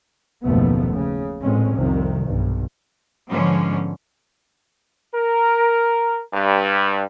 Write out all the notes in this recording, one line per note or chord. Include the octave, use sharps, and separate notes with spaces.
F#1 D#2 B2 F3 A3 B3
C#3
A1 A#2 G#3 C4 C#4
C2 F2 C3 D#3
B1 G2
G#2 D3 F3 B3 C#4
A#4
G2